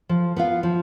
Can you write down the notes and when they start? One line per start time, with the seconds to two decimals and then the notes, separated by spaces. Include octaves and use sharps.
0.09 F3
0.36 B3 F4 B4 F5
0.63 F3